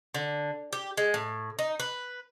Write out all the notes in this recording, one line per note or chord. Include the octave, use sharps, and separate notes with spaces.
D3
G4
G#3
A2
D#4
B4